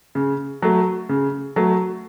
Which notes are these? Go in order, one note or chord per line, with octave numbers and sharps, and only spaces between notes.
C#3
F#3 A3
C#3
F#3 A3